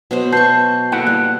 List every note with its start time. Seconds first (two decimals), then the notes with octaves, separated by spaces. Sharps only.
0.11 B2 F#3 C5
0.32 B2 A5 C6 C#6 G6 C7
0.92 A#3 E4 A4 F#5
1.07 G3 F#6